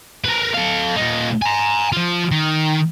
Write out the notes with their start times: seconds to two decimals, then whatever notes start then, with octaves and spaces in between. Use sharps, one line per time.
0.25 A#4 B4
0.54 A4 F5
0.96 A#2 D#4
1.42 G#5 A#5
1.92 F3 F4
2.31 D#3